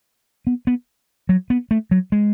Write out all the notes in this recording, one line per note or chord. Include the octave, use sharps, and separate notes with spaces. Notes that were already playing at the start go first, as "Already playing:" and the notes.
B3
B3
F#3
B3
A3
F#3
G#3